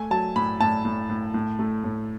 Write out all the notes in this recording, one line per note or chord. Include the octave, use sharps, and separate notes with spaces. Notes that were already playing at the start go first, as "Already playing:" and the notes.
Already playing: A3 G#5
F#3 A5
A2 B5
A2 A5
A2
A2
A2
A3
A2